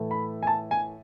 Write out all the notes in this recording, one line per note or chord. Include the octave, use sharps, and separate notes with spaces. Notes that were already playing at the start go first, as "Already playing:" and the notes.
Already playing: A2 E3 A3
B5
G#5
A5
G#5